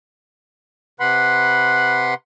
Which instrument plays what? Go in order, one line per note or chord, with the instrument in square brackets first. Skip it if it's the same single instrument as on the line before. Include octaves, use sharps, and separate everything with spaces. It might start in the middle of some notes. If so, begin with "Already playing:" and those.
[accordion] C3 B4 F#5 B5 C6